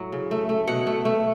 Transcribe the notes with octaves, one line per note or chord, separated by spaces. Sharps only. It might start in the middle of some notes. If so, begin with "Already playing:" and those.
Already playing: A2 F#3
C#3
A3
A3
B2 F#5
A3
A3